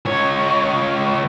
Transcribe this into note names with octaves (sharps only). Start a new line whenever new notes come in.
C#2 C#5